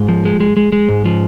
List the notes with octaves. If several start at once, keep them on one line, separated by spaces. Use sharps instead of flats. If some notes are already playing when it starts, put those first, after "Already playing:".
Already playing: G#2 F4 G#4
F3
G#3
G#3
G#3
G#3
G#2
F3